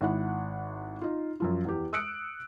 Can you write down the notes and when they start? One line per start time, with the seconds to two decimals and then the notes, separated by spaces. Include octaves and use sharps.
0.01 G#1 E4 F#5
1.01 D#4 F4
1.40 F#2 F3 F4
1.65 E2 G4
1.93 D#6 E6 F#6 C#7 D7